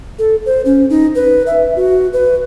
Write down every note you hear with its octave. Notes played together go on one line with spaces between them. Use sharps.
A4
C5
C#4
D#4
B4
E5
F#4
B4